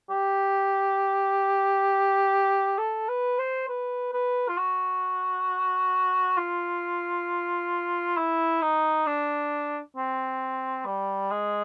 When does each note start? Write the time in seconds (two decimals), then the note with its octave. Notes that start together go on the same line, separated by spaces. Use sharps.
0.10 G4
2.78 A4
3.09 B4
3.39 C5
3.68 B4
4.13 B4
4.48 F4
4.58 F#4
6.37 F4
8.17 E4
8.62 D#4
9.07 D4
9.96 C4
10.86 G3
11.31 G#3